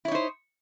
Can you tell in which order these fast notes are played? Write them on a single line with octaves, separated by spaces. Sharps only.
E4 C#5 D#4 C5